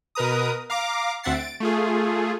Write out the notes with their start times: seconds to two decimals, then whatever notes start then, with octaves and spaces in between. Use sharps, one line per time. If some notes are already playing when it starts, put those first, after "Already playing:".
0.15 B2 A#4 B4 A#5 D#6
0.70 F5 A#5 D6
1.23 D2 C4 E5 F#5 A6 C7
1.34 A6 D7
1.60 A3 F4 G#4